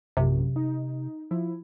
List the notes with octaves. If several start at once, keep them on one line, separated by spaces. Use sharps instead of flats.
A#1 F#2 C3
D#4
F3 E4